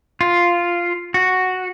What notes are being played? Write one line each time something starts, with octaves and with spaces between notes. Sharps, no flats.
F4
F#4